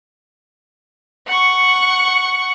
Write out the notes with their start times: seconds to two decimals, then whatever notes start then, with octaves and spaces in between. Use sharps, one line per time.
1.28 F#5 C#6